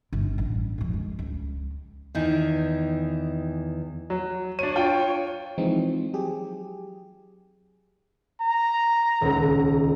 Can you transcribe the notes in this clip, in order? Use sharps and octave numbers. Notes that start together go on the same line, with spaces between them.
G1 G3
A1
G#1 F2
G#3
C#2
E2 D#3 E3
F#3
D4 C#5 D#7
F4 G5
E3 F3 G#3 C4 D#4
F#3 G4 G#4
A#5
D#1 C#2